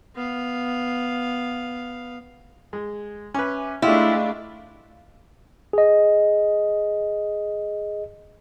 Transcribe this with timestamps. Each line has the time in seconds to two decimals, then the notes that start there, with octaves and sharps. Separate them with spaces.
0.15 B3 F5
2.73 G#3
3.34 C#4 B4 E5 G#5 D6
3.82 G#3 A3 D4 E4 F4 G4 D#5 F5
5.73 G#4 D#5